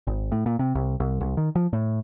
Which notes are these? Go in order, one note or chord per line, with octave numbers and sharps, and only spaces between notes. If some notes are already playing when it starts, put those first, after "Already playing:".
G#1
A2
A#2
C3
C2
C2
C2
D#3
F3
A2